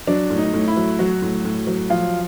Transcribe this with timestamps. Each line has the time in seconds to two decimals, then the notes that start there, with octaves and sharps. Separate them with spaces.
0.07 F#3 D4
0.30 A2
0.38 D#4
0.53 A2
0.68 E4
0.76 F#3
0.99 F#3 F#4
1.22 A2
1.45 A2
1.67 F#3
1.90 F3 F4